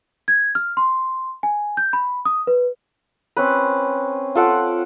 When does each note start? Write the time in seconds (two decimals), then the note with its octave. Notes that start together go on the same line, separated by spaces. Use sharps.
0.28 G#6
0.55 F6
0.77 C6
1.43 G#5
1.77 G6
1.93 B5
2.25 D#6
2.47 B4
3.37 C4 C#4 B4
4.35 F4 A4 F#5 D6